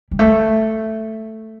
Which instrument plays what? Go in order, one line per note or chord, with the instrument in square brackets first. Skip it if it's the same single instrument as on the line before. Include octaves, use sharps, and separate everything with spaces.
[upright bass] G3
A3